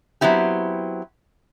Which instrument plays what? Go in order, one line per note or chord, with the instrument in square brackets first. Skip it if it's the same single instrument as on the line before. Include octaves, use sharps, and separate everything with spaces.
[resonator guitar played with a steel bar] F#3 B3 C4 E4 G4